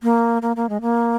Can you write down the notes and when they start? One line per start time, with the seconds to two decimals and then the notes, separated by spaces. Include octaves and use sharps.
0.03 A#3
0.42 A#3
0.56 A#3
0.69 G#3
0.81 A#3